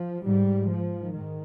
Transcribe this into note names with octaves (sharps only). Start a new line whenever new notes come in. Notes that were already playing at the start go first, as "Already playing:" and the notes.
Already playing: F3
G#2 G3
F3
G#2 D#3